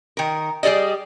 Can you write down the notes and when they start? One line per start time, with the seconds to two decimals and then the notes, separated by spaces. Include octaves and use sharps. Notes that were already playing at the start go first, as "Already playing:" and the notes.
0.17 D#3 A#4
0.63 G3 G#4 A4 D5 D#5